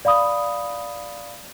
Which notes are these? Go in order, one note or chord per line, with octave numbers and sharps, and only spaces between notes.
D5 F5 B5 D#6